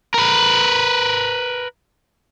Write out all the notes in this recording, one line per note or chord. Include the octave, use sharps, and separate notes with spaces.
A#4 B4